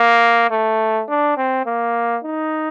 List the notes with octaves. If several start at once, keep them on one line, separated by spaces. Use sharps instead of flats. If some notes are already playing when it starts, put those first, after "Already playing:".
Already playing: A#3
A3
D4
C4
A#3
D#4